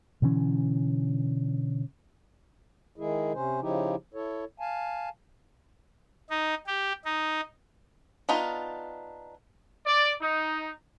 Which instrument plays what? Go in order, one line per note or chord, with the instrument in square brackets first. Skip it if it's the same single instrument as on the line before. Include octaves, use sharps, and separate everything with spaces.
[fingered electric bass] B2 D3 E3 C#4
[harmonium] D#3 G#3 E4 G#4
C3 C#4 C5
C#3 F3 D#4 E4 G4
E4 A4 C#5
F5 G#5 A5
[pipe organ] D#4
G4
D#4
[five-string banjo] B3 D4 D#4 F4
[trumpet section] D5
D#4